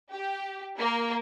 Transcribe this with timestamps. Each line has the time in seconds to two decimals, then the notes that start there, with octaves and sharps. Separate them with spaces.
0.12 G4
0.79 A#3